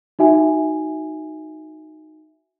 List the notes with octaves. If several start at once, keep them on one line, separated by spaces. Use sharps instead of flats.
D#4 F#4 E5 G#5